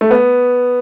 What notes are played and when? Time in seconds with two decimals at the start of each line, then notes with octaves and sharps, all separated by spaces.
0.01 A3
0.11 B3